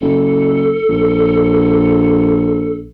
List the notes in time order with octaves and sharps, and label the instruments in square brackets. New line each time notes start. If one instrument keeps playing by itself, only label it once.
[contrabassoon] F#1 [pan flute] A4
[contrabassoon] A#1